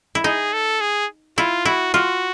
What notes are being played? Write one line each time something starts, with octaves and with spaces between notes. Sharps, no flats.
E4
D#4 G#4
A4
G#4
E4 F4
E4 F#4
F4 F#4